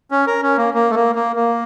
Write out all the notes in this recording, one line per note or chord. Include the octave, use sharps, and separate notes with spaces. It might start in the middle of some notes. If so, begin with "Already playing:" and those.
C#4
A#4
C#4
A#3
A#3
A3
A#3
A#3
A#3